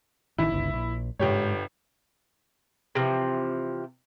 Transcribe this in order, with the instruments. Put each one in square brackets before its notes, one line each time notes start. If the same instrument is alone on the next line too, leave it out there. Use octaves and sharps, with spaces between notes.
[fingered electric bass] A1 D#3 [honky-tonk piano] E4
[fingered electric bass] G1 C#2
A#1
[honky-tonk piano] G1 G4 C#5 [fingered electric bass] G#2
[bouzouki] C3 E3 F3